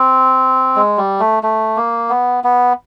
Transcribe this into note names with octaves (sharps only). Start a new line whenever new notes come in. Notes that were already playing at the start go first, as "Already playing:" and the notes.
Already playing: C4
G#3
G3
A3
A3
A#3
B3
B3